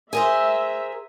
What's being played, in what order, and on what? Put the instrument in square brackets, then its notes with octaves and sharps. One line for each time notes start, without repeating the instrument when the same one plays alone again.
[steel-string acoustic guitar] G#4 A#4 C5 [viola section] E5